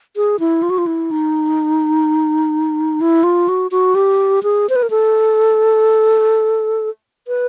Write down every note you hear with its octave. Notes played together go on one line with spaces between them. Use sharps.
G#4
E4
F4
F#4
F4
E4
D#4
E4
F4
F#4
F#4
G4
G#4
C5
B4
A#4
A4
B4